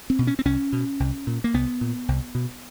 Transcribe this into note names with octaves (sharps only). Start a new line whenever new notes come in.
C4
B2
C#4
C4
C2 C#4
B2
C2
A#2
A#3
C2 B3
A#2
C2
B2